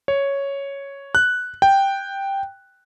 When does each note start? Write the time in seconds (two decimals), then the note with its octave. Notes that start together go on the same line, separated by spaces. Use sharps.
0.08 C#5
1.15 F#6
1.62 G5